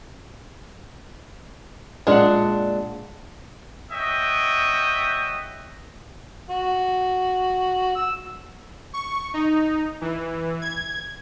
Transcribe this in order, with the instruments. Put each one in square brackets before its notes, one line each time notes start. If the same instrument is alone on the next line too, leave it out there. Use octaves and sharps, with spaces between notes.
[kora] A#2 F#5 [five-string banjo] G#3 D4
[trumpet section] C#5 D#5 E5 F#5 G5
[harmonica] F#4
E6
[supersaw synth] C#6
D#4
E3
G#6